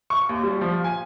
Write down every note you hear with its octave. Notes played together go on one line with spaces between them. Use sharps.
C#6
D#2
G3
F3
G#5